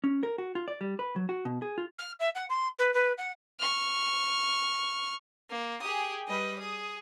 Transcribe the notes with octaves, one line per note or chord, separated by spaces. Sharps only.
C#4
A#4
F#4
F4
D5
G3
B4
F#3
F#4
B2
G#4
F4
F6
E5
F#5
C6
B4
B4
F#5
C#6 F6
A#3
G4 G#4 D#6
G3 B4 D#5
G#4 D#6